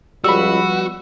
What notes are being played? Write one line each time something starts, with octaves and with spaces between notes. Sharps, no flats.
C#2 F3 G3 F#4 B5 E6
B3